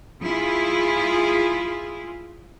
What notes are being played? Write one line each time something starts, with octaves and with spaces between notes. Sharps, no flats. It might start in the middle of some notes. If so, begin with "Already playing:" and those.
E4 F4 G#4